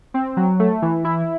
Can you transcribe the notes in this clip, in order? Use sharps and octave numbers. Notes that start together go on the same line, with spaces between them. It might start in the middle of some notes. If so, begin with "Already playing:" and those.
C4
F#3
A3
E3
E4